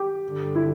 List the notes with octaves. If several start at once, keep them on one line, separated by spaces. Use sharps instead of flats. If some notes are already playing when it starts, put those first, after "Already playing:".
Already playing: G4
G2 D3 G3
E4